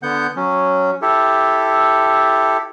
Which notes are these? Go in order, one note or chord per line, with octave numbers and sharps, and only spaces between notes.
D3 B3 F#5 G6
F#3 C#4
E4 G4 A4